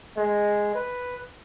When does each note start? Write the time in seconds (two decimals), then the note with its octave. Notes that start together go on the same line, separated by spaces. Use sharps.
0.17 G#3
0.75 B4